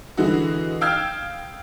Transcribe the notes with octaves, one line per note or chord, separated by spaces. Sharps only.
D3 E3 G#3 D#4 F#4
F5 G5 E6 F6 G6 G#6